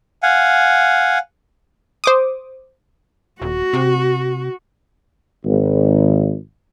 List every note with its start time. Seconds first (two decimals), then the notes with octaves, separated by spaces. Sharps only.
0.23 F5 F#5 G#5
2.04 C5 D6 D#6
3.42 D#1 F#4
3.73 C3
5.44 G#1